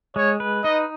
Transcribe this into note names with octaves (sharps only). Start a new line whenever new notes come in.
G#3 C#5
B4
D#4 D#5